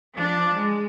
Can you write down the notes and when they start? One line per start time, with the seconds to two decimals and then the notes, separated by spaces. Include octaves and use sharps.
0.14 F3 D4
0.55 G#3